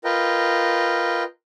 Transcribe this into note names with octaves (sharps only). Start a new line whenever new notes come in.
F4 A#4 B4 D#5 G5